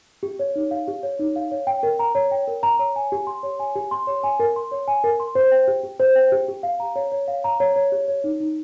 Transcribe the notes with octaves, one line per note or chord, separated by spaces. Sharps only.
G4
C#5
D#4
F5
G4
C#5
D#4
F5
C#5
G5
A#4
A#5
C#5
G5
A#4
A#5
C#5
G#5
G4
C6
C#5
G#5
G4
C6
C#5
G#5
A#4
C6
C#5
G#5
A#4
C6
C5
G5
G4
G4
C5
G5
G4
G4
F5
A#5
C#5
C#5
F5
A#5
C#5
C#5
G4
C#5
D#4
D#4